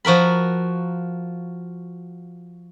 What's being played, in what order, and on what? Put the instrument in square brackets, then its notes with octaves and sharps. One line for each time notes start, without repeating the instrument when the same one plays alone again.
[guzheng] F3 F#4 A#4 B5